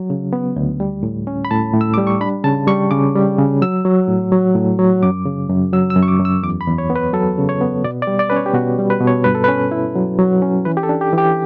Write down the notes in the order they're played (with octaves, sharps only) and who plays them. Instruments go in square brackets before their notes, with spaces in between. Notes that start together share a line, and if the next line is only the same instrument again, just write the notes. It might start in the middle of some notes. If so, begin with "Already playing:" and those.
Already playing: [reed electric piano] F#3
C#3
B3
D2
G3
A2
C#4
B5
A2 A5
A2
E6
G3 D6
C#6
D4 B5
C#3 A5
G3 C#6
C#3 D6
G3
C#3
F#3 E6
F#3
A2
F#3
A2
F#3
F#2 D6
C#3
F#2
F#3 E6
E6
F#2
C#6
D6
F#2
E6
E2 D6
B5
E2
C#5
B3
B4
F#3 A4
C#3
C#5
B3
B2 D5
D5
G3
D5
C#4 B4
C#5
G4
B2 F#4
G3
B4
B2
C#5
G2 B4
A4
C#4 B4
E4
F#3
F#3
C#4
E3 B4
G4
A4
D4
G4
E3 G4